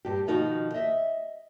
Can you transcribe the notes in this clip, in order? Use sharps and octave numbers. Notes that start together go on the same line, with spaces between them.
G2 G4
B2 D#3 F3 D#4 F#4
D#5 E5